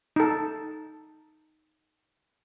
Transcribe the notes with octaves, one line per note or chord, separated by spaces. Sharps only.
D#4 A4